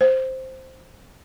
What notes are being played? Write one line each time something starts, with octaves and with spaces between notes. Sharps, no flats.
C5